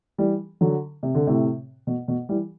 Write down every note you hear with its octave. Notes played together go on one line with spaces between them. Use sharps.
E3 G3
D3 F#3
C3
D3
A2 C3
B2
B2
E3 G3